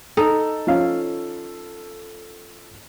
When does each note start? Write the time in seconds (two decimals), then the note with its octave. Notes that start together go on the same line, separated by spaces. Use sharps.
0.17 D#4 A4
0.67 F3 C#4 F5